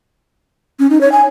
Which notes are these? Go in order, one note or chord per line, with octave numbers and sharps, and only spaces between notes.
C#4
D#4
C#5
G#5